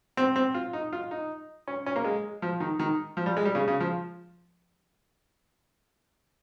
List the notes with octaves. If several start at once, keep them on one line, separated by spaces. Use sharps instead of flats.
C4
C4
F4
D#4
F4
D#4
C#4
C#4
A#3
G#3
F3
D#3
D#3
F3
G3
G#3
G3
C#3
C#3
F3